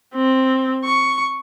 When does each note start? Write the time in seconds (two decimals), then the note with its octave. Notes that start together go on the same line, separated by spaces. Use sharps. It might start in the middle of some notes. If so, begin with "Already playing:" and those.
0.15 C4
0.85 C#6